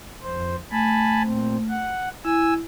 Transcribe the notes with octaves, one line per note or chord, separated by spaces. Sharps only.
F2 C5
A3 G#5 A5 B5
A#2 C4
F#5
E4 G#5 E6